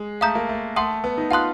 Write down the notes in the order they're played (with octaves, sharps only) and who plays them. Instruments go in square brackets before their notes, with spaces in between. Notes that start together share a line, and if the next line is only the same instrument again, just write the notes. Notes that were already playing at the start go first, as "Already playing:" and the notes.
Already playing: [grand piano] G#3
[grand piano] A3 [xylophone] F5 A#5 D#6 G6
[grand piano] A#3
A3
[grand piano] A3 [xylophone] F#5 A5 C6 D#6
[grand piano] B3
D#4
[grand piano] F4 [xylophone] F#5 A5 C6 D#6 F#6